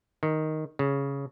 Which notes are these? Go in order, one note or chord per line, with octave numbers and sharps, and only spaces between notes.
D#3
C#3